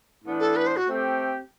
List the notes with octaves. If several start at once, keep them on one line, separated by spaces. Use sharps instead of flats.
A2 E3 B3 D4
A4
B4
C5
F#4
A3 C4 G4